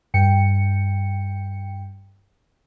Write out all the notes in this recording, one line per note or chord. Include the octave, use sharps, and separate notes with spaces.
G2 G5 C#7